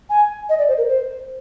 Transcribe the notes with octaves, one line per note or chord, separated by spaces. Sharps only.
G#5
D#5
D5
C5
A#4
C5